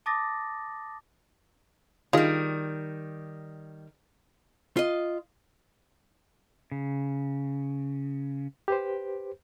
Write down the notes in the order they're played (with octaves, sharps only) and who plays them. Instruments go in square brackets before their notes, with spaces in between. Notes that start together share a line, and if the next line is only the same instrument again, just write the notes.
[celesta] A5 D6 D#6 A6 A#6
[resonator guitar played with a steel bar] D#3 G3 [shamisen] F4 G#4 D#5
[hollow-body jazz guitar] F4 D#5
[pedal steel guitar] C#3
[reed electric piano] G4 B4 C5